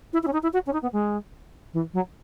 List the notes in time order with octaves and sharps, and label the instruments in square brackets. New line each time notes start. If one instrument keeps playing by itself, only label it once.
[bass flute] E4
E4
C#4
D#4
E4
F#4
C#4
D#4
B3
G#3
E3
F#3